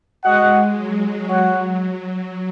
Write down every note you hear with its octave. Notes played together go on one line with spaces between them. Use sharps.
G#3 F#4 D#5 F#5
F#3
F#3 F#4 C#5 F#5
F#3